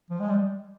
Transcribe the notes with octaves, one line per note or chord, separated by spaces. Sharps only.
F3
G#3
G3